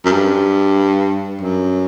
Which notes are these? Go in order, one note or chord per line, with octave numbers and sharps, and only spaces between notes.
F#2
G2
F#2